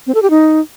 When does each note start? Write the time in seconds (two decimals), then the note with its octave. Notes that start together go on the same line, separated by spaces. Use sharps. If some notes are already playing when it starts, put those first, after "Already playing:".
0.07 C4
0.15 A4
0.22 G4
0.30 D#4